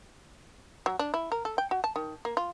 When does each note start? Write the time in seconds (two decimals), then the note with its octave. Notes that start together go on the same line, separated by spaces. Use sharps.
0.86 F#3
0.99 D4
1.14 E4
1.32 A#4
1.45 A4
1.58 G5
1.71 F#4
1.84 A5
1.96 D#3
2.25 A#3
2.37 F4